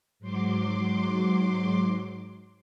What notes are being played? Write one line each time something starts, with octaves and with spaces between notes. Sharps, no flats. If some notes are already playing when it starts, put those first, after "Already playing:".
G#2 F#3 C6 D6